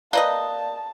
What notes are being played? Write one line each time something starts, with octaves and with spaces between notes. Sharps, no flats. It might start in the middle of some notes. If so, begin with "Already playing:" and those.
A#3 B4 D5 D#5 F5 A5 F#6